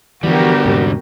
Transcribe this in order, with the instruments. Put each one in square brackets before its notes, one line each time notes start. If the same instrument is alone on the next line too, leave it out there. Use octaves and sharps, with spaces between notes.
[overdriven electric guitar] D3 G3 [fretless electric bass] E3 F3 [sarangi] B3 [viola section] F#4 G4 A#4
[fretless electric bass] E2 G#2 C3